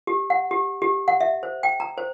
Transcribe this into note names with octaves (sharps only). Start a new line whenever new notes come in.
G4
F#5
G4
G4
F#5
E5
C5
G5
A#5
C5